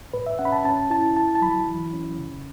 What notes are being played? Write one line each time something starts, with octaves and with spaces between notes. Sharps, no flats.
A2 B4
E5
C#4 F#5
B5
A5
C#4 A5
E4 A5
E4 A5
A5
F#3 B5
E3
C#4
C#3